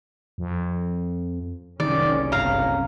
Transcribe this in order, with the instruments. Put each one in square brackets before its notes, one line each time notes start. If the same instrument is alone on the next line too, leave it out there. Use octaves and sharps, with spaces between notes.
[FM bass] F2
[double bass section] F#1 C2 C#4 [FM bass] D#3 [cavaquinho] D5
[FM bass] G1 [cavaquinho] F5 A#5